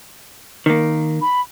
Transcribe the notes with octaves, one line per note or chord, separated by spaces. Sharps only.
D#3 A#3
B5